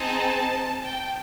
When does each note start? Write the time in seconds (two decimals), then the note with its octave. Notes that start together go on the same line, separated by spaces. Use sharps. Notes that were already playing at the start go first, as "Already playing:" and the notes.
Already playing: C4 D#4 G#4 A5
0.82 G5